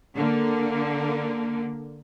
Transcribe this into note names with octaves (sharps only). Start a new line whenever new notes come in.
D3 A#3